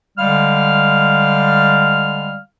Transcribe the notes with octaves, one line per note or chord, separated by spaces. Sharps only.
D3 G3 G#3 F5 F6